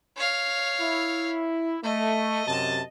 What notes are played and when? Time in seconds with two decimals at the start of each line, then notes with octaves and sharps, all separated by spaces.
0.16 C#5 F5
0.80 E4
1.84 A3 D#5
2.47 F#2 C3 A5